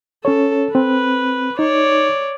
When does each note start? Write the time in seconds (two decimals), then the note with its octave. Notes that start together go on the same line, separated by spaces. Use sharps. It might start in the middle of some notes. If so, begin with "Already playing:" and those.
0.25 C#4 A4 C#5
0.75 C4 B4
1.59 D#4 C#5 D5